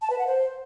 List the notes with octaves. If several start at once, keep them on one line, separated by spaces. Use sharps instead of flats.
A5
B4
F#5
C5